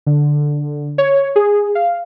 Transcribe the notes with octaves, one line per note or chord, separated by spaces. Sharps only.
D3
C#5
G#4
F5